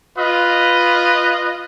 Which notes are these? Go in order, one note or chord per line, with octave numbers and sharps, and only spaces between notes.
F4 B4 D#5